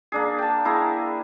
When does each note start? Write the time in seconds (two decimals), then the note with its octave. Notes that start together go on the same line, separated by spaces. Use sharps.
0.12 A#3 D4 G#4
0.39 G5 A5
0.65 A#3 E4 G#4 A#5